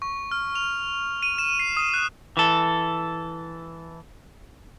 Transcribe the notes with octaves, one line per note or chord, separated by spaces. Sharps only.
C#6
F6
F7
D#7
E7
C7
D#6
F#6
E3 A4